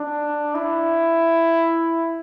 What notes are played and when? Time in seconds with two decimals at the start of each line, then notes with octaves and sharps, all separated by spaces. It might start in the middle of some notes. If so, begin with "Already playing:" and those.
Already playing: D4
0.55 E4